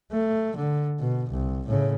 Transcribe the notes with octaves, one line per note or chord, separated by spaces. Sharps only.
A3
D3
B2
C2
A2 C#3